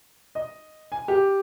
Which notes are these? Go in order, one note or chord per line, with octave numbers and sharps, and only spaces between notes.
D#5
G#5
G4